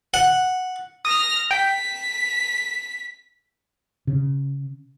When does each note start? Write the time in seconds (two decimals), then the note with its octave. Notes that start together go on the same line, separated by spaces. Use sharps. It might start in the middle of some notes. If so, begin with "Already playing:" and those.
0.14 F#5
1.05 D#6 F6 A#6
1.51 G5 B6
4.07 C#3